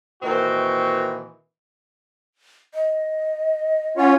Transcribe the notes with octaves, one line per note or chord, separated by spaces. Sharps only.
A#2 D#3 E3 C4 D#4 F#4
D#5
C#4 F4 C#5 F#5